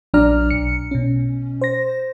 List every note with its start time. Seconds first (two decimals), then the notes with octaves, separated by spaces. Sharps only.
0.14 A#1 F#3 D4 D5 A#5 F6
0.51 B1 C#7
0.91 B2 C#4
1.61 C5 A#6